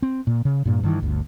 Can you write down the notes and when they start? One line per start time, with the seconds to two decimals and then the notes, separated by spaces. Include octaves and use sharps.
0.02 C4
0.27 A#2
0.45 C#3
0.65 G2 A#2
0.83 G2 D#3 E3
1.00 G1 D2